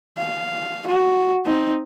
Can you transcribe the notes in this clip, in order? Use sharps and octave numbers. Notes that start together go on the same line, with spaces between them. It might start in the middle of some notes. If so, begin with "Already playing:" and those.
F5
F#4
C4 D#4